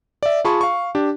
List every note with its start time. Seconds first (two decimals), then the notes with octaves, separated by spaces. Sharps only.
0.23 D5 E5
0.45 F4 G#4 A5 B5 C#6
0.61 F5 C#6
0.95 D4 G4